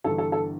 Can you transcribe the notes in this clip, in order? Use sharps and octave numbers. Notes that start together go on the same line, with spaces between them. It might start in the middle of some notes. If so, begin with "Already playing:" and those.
G1 G2 E3 A4
A4
A4